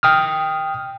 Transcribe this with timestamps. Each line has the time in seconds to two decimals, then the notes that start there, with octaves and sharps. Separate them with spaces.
0.03 G5 D#6 F6